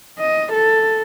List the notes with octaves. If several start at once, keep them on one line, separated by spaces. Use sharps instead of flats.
D#5
A4